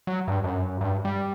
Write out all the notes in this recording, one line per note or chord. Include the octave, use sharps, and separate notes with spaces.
F#3
G2
F#2
G2
G3